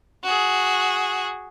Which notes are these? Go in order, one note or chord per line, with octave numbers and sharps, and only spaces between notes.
F#4 G#4